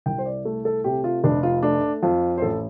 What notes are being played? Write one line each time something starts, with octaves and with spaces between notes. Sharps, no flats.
C2 G5
C5
D5
A3 A4
A4
C3 G4
F4
F1 D4
F4
A3 D4
F2 F4
C5
A1 A4